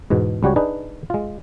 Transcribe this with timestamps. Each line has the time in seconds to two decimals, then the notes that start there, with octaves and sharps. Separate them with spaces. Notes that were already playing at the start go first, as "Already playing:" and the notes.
0.10 E2 G#2 B2
0.43 C#2 G3 F#4 G4 C#5
0.56 D4 D#4 G#4 B4
1.10 G#3 F4